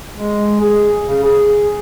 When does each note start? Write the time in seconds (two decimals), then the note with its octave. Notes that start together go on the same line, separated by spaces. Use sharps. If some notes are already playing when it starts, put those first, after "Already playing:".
0.14 G#3
0.60 G#4
1.06 C#3
1.23 G#4